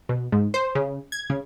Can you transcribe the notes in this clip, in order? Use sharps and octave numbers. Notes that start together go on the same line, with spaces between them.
B2
G#2
C5
C#3
G#6
C#3